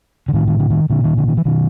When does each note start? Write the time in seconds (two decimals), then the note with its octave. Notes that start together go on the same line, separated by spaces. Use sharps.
0.28 D3
0.33 A2 D#3
0.48 D#3
0.60 D3
0.70 D#3
0.90 A#2 D3
1.04 D#3
1.17 D3
1.28 D#3
1.37 E3
1.45 B2 D#3